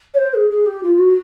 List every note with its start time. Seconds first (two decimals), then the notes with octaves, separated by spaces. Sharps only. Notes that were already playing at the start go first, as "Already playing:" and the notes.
0.14 C#5
0.18 C5
0.34 G#4
0.50 G#4
0.66 G4
0.83 F4
0.98 F#4